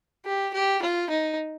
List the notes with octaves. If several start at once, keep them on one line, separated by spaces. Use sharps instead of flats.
G4
G4
F4
D#4